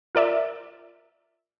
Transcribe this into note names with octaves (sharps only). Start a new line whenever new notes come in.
F4 A#4 D5 E5